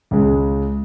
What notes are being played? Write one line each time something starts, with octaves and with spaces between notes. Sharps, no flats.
C#2 C#3 G#3